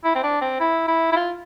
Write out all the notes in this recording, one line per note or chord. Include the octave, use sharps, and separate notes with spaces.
E4
C4
D4
C4
E4
E4
E4
F4